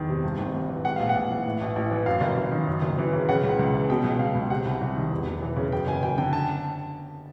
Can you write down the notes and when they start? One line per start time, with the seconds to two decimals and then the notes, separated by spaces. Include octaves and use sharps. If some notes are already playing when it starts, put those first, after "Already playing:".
Already playing: E2 D#3
0.09 C3
0.24 G2
0.38 G#1
0.54 G#1
0.69 E3
0.84 G#2 F#5
0.96 A#1 F5
1.09 F#5
1.15 A#1
1.30 E3
1.46 A2
1.61 A1
1.76 A1
1.91 E3
2.06 F#2 F5
2.21 F#1
2.37 F#1
2.51 D#3
2.67 F#2
2.82 F#1
2.98 E3
3.13 C#3
3.29 C#3 F#5
3.43 C#2
3.59 C#2
3.74 E3
3.89 B2 G5
4.04 C#2
4.19 B2 F5
4.35 C#2
4.50 C3 F#5
4.65 C2
4.81 C2
4.96 D#3
5.11 E2
5.27 E1
5.42 E3
5.56 C#3
5.72 F#2 G5
5.87 F#1 G#5
6.03 F#1 G5
6.18 D3 G5
6.33 A5